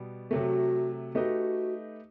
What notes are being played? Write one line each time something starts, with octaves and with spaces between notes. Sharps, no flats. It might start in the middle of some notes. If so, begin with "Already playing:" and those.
Already playing: B2 G3 B3
C3 F#3 A3 F#4
A3 D#4 F#4 G4 B4 D#5